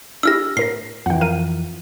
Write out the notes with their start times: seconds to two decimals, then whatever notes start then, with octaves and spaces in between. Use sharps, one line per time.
0.23 D4 E4 G4 E6 F6 A#6
0.57 A2 A#4 A#6 C7
1.06 F2 E3 F#5 G5
1.21 A#4 F5 D#7